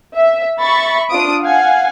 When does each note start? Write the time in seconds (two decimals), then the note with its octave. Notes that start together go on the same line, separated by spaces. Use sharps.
0.16 E5
0.60 E5 B5 C#6 A6
1.09 D4 F4 D#6 D7
1.43 F5 F#5 G#5